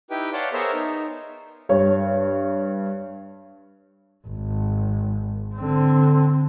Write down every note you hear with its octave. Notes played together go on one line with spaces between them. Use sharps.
D#4 E4 G4 B4 G5
C#5 D5 F5 F#5 A5 C6
B3 G#4 A#4 C5 C#5 E5
D#4
G2 C#5
G#1
D3 C4